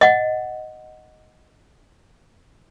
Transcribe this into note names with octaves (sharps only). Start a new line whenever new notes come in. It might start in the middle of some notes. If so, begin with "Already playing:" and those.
D#5 F#5